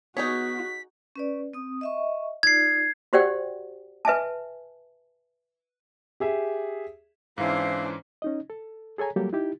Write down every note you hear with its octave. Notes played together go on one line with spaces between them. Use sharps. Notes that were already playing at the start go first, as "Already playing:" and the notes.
B3 D#4 F#4 G#4 C#5 B6
C#4 B4 D5
C4 D#6
D#5 E5 C#6
D#4 F4 D5 G#6 C7
F#4 G4 C5 D5 F#5 G5
B4 E5 G#5 A5
G4 G#4 E5
G#2 E3 C#4 D4 E4 C5 F5
C#4 D#4 D#5
A4
G#4 A4 C#5 G#5 A#5
F#3 G3 A#3 G4 A4
D#4 E4 G4